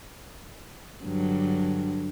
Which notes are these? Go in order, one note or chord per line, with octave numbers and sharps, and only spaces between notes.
G2 D3 F#3